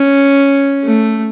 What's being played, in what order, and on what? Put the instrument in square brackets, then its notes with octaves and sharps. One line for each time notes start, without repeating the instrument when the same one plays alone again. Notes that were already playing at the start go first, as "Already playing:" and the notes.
Already playing: [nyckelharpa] C#4
A3